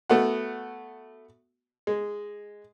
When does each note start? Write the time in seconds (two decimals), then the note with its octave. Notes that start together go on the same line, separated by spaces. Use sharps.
0.10 A3 B3 F#4
1.87 G#3